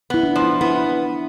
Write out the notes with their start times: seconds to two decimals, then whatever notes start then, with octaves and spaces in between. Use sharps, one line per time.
0.10 B3 E4
0.23 D4
0.36 F3
0.42 E4
0.61 B3 E4